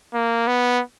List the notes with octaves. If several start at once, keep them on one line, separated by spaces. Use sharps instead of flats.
A#3
B3